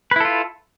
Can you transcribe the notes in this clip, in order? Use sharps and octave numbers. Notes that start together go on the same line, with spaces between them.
E4 F4 A4 B4